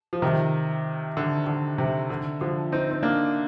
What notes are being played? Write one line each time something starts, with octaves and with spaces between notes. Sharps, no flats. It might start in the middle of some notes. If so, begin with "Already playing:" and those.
F3
C3 D#3
D3
D3
C3
D3
D3 F3
C4 D#4
C4
A#3 D4